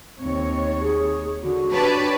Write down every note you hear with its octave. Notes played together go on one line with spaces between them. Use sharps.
D#2 C4 C#5
G#4
D3 F#4
D4 G4 B4 C#5 D5 A5